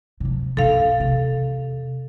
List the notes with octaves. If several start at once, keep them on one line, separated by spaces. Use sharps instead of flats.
C3 F3
B1 G2 A4 F5
E2 C3